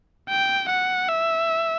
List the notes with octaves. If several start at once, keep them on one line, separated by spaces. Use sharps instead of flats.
G5
F#5
E5